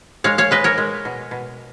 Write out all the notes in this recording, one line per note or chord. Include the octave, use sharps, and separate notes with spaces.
G#3 C#5 F5
C#5 F5
G#3 B4 D#5
A#4 C#5
G#3
B2
B2